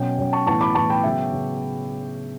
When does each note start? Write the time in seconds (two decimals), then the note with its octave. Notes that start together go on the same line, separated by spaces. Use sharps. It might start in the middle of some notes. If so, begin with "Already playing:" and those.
Already playing: B2 F#3 C#4 G5
0.18 B2 F#3 C#4
0.33 A5 C#6
0.46 A2 E3 B3 A5 C#6
0.61 B5 D6
0.75 A2 E3 B3 A5 C#6
0.90 G5 B5
1.04 C#3 F#3 B3 E5 G5
1.33 C#3